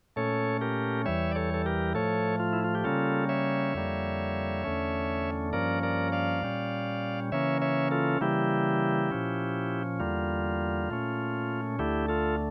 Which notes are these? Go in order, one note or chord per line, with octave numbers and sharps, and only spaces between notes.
A#2 A3 C#4 A4 C#5
G4 A#4
E2 E3 G3 C#5 E5
D5
A4 C#5
A4
G4 A#4
A2 F3 A3 A4 C#5
F4
E4
F4
G4
C#3 G3 A#3 C#4 F4 A4
C#5 E5
F2 D3 G3 A#3
E2 D3 A3 C#4
G2 F3 A#3 C#4 A#4 D5
A#4 D5
D5 F5
A#2 G3 C#4
C#3 E3 A#3 C#4 C#5 E5
C#5 E5
F4 A4
C#3 E3 G3 A#3 E4 G4
A#2 F3 C#4
E2 D3 G3 A#3 F4
A#2 A3 C#4
D2 D3 A3 E4 G4
F4 A4